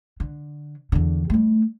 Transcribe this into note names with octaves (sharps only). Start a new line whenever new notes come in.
D3
E2 D3
G3 A3